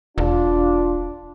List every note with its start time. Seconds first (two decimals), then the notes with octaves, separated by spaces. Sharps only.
0.18 E1 D4 F4